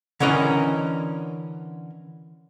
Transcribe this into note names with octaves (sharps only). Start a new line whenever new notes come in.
D3 E3 C#4 A#4 D#5